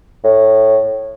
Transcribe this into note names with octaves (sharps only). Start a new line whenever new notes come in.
A2